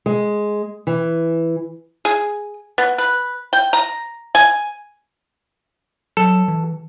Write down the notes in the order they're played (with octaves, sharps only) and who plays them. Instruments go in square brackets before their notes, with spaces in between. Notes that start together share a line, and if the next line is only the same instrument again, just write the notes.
[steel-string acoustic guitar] G#3
E3
[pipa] G#4
B3
B4
G5
A#5
G#5
[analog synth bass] F#3 [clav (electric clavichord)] A4
[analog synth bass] E3